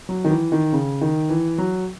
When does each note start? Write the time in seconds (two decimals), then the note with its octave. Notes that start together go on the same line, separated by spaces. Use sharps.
0.09 F#3
0.25 D#3
0.30 E3
0.52 D#3
0.73 C#3
1.01 D#3
1.29 E3
1.58 F#3